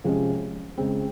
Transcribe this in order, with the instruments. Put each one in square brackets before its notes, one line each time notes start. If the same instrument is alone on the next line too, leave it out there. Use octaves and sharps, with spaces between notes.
[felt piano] C3 F3 G#3 C#4
C#2 C#3 G#3 C4